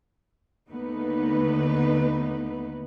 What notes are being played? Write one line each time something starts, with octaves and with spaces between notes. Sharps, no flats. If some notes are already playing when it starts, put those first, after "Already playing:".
D#2 D3 A3 B3 D#4 B4